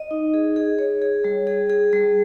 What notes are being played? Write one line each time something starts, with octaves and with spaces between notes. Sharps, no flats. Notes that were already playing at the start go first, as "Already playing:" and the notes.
Already playing: D#5
D#4
G#4
G#4
C#5
G#4
G3
G#4
G#4
G3